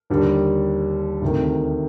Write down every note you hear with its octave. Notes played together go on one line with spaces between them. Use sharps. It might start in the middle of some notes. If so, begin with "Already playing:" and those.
D#2 D3 G3
D2 C3 D#3